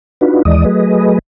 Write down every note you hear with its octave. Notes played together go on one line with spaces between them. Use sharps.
D4 D#4 F4 F#4 B4
D#2 E3 G#3 D5 D#5 D#6
F#3 A3 G#4 B4 D#5